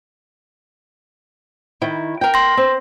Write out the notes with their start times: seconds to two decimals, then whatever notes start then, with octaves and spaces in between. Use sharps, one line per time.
1.82 D#3 E4
2.21 A#4 G5
2.34 C6 A#6
2.57 C4